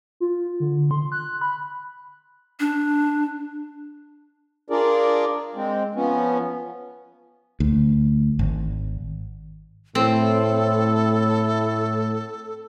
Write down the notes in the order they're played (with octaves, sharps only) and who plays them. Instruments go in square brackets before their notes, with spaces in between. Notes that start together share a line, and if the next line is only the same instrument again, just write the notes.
[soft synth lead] F4
D3
C6
F#6
B5
[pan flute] D4
[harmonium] D4 F4 G#4 A#4 D5
G#3 C4
F3 B3 C#4
[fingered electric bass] D2
G#1
[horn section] A2 [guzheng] C4 [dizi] A4